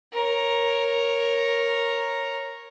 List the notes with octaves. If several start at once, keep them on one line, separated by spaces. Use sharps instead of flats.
A#4 C#5